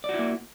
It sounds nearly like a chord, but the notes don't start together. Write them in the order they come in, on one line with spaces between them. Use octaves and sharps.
D5 F#4 E4 A#3